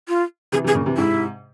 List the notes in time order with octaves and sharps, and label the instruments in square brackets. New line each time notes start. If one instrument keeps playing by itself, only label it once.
[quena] F4
[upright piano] C3 E3 [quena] G#4
[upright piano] C3 E3
[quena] G#4
[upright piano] A#2 C#3
C3 E3
[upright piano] G#2 C3 [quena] E4